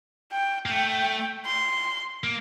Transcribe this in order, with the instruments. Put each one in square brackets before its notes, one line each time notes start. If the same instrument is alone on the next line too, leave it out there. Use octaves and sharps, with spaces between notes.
[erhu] G5
[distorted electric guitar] A#3
[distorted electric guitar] A3 [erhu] G5
[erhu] C6
[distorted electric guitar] A#3